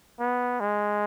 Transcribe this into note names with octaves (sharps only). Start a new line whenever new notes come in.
B3
G#3